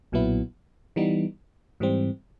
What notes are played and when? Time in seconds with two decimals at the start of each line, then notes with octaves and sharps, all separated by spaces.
0.12 B1 A#2 F#3 B3 E4
0.96 E3 G3 B3 D#4
1.80 G#2 E3 G3 C4